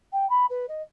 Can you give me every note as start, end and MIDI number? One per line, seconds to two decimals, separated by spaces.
0.12 0.28 79
0.29 0.46 83
0.49 0.66 71
0.68 0.82 75